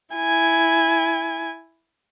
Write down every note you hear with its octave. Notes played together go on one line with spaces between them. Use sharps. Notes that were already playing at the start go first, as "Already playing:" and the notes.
E4 G#5